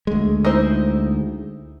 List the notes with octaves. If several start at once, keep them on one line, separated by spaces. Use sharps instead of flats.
D2 G#3
D#4 E4 C5